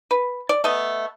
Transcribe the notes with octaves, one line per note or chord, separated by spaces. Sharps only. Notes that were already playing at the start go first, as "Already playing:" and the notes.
B4
D5
A3 B3 D#5